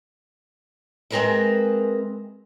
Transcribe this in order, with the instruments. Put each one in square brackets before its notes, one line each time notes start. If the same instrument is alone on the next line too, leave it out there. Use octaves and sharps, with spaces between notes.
[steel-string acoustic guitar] G#3 C4 G#4 A#4 B4 E5